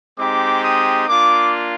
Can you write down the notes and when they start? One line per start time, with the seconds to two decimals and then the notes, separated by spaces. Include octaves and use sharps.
0.18 G#3 C4 D#4 G4 D6
0.63 D#6
1.08 A#3 D4 F4 D6